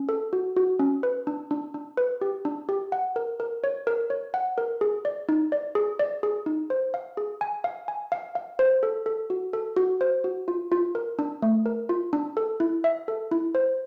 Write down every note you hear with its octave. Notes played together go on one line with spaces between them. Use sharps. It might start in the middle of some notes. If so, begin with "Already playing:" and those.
Already playing: C#4
A4
F#4
F#4
C#4
B4
D4
D4
D4
B4
G4
D4
G4
F#5
A#4
A#4
C#5
A#4
C#5
F#5
A#4
G#4
D5
D#4
D5
G#4
D5
G#4
D#4
C5
F5
G#4
G#5
F5
G#5
F5
F5
C5
A4
A4
F#4
A4
F#4
C5
F#4
F4
F4
A#4
D4
A3
A#4
F4
D4
A4
E4
E5
A4
E4
C5